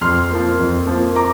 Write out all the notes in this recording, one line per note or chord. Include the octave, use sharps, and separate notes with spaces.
F2 C6 F6
F3 A#3
F2
F3 A#3
A#5 D6